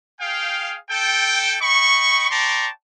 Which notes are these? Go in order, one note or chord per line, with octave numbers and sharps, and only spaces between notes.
G#4 F5 G5
A4 G5
D#5 G5 B5 C#6
D5 G5 A5 A#5 C6 C#6